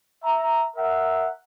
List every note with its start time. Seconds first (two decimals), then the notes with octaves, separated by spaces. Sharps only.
0.23 E5 A#5
0.76 A#4 E5 F#5